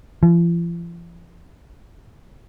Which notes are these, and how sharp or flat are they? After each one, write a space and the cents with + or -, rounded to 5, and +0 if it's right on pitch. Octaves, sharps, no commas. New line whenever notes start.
F3 -45